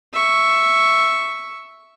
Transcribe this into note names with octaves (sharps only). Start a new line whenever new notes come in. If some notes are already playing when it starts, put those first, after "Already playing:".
E5 C#6